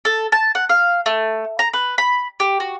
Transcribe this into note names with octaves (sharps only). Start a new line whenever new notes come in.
A4
A5
F#5
F5
A3
A#5
B4
B5
G4
F#4